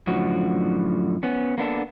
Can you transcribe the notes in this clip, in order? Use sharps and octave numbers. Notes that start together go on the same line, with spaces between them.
F#2 A2 D3 F3 F#4
B3 C#4
A#3 B3 D4 A4